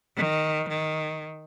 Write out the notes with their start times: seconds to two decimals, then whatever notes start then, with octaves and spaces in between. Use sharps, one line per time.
0.17 D#3
0.69 D#3